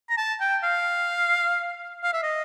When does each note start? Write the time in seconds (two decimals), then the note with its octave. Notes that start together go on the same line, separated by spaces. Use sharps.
0.10 A#5
0.18 A5
0.40 G5
0.64 F5
2.04 F5
2.13 E5
2.23 D#5